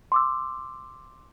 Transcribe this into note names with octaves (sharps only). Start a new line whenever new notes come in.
C6 D6 E6